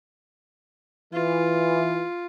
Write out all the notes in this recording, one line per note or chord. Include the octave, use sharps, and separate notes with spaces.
E3 F4